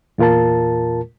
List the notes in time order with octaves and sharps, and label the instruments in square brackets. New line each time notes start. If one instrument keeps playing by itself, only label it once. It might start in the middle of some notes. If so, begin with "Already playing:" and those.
[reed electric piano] E2 A#2 F4 A#4 A5